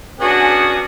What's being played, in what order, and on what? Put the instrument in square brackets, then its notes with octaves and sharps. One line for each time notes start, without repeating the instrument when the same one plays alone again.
[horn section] B3 C#4 D4 F#4 G#4